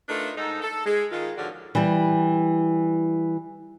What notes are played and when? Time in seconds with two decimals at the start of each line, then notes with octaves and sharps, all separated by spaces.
0.09 A3 D4 D#4 F4 A#4 B4
0.37 G#2 D#4 A4
0.62 A4
0.86 G#3
1.11 D#3 G#3 F4
1.37 G#2 D3 F3 C#4 F#4 D5
1.75 E3 G3